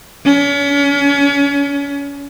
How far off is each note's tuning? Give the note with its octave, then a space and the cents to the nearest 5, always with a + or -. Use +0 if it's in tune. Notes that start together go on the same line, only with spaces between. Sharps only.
C#4 +35